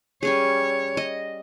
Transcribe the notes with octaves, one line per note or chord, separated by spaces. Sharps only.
G3 C#4 G#4 C#5
D#5